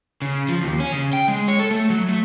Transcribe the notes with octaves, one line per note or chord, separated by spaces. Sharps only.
C#3
F3
D#2
C#4
C#3
G5
G#3
C#5
A4
A3
F#3
A3